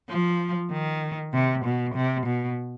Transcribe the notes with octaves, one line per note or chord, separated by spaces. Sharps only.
F3
D#3
C3
B2
C3
B2